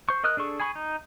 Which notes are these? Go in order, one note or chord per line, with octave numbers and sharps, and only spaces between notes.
C5 C#6
A#4 D#5 D#6 F6 F#6
D4 G#4 A4 C#6
G#4 G#5 B5 C#6
D#4